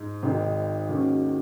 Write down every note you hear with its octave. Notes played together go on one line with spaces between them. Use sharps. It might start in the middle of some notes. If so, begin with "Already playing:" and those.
Already playing: G#2
G#1 G#2 D#3 G#3
D#2 D#3 G#3 C#4 F#4